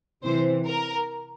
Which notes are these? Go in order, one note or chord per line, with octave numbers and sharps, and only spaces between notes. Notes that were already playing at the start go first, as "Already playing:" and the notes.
C3 E3 C5
A#4